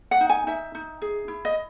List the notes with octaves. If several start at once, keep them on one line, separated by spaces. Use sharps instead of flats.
F#5
D#4
G#5
D#4 E5
D#4
G#4
E4
D#5